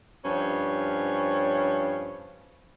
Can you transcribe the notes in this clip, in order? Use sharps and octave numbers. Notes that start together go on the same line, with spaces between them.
G2 F3 C#4